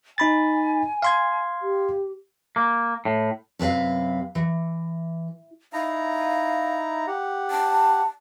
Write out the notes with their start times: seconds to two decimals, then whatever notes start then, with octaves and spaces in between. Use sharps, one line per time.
0.18 D#4 G#5 B5 A6
1.02 F5 C6 G#6
1.62 G4
2.56 A#3
3.05 A2
3.59 F#2 C3 B4 F5
4.35 E3
5.73 D#4 E4 F5 A#5
7.07 G4 F#5
7.51 A5